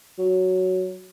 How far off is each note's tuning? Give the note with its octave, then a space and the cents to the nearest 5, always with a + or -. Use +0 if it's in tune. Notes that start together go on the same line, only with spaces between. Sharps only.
F#3 +5